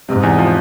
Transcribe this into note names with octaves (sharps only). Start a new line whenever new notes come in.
G#2 C3
E2
F3